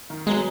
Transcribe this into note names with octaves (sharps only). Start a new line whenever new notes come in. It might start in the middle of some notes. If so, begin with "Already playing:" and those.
D#3
F#3 G#3 B3 G#4